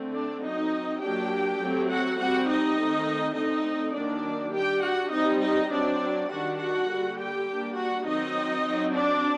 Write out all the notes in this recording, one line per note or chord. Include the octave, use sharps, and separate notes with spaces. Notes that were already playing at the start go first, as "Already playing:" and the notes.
Already playing: D3 A3 C4
D4 D5
F#3 C4 D#4 D#5
F#3 A#3 D4 G4 G5
F#3 A3 C4
F#4 F#5
G3 C4 F#4 F#5
D#4 D#5
D#3 A3 C4
D3 A3 C4 D#4 D#5
D#3 F#3 A#3 D4 D5
G3 D4 G4 G5
F#4 F#5
G3 C4 D#4 D#5
D#4 D#5
F#3 C4 D4 D5
D#3 G3 D4 F#4 F#5
F#4 F#5
D3 G3 A#3
G4 G5
G3 A#3 D4
F#4 F#5
D#3 F#3 C4 D#4 D#5
F#3 C4
D4 D5